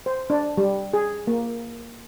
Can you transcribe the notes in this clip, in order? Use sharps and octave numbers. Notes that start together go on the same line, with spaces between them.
C5
D4
G3
G#4
A#3